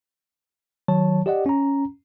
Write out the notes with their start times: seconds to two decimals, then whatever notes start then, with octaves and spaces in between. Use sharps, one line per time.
0.88 D#3 F#3 C#5 A5
1.26 G4 D5 D#5 F#5
1.46 C#4 A#5